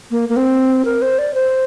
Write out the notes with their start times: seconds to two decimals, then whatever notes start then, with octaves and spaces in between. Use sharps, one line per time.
0.11 A#3
0.29 A#3
0.37 C4
0.85 A#4
1.02 C5
1.19 D5
1.34 C5